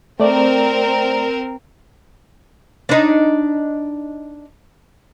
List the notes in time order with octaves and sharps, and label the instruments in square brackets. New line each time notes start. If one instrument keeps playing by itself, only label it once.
[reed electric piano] A3 D5 [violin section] C4 A#4
[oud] D4 D#4